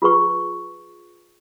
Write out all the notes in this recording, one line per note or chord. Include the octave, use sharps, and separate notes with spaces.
F4 G#4 B4 C#6